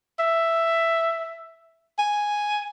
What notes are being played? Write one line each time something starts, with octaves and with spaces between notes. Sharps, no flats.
E5
G#5